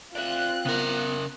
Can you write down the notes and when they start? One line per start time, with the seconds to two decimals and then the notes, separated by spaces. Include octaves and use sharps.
0.15 C4 F4 D5 E5 F#6
0.65 C#3 B3 A#4